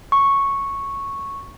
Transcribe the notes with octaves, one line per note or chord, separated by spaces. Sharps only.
C#6